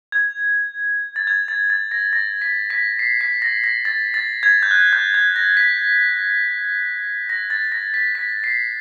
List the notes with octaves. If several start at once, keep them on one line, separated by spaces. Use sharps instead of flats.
G#6
A6
G#6
A6
A6
A#6
A#6
B6
B6
C7
B6
A#6
A#6
A6
A6
G#6
G6
F#6
G6
G#6
A#6
B6
A#6
A6
A#6
B6
B6
C7